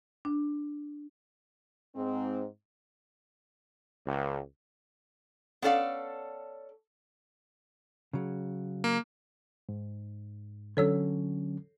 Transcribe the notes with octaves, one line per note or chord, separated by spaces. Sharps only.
D4
G#2 C4
C#2
B3 C#4 A4 D5 F5
C#3 F#3
A#3
G#2
D3 F#3 C#4 A4 C#5 E6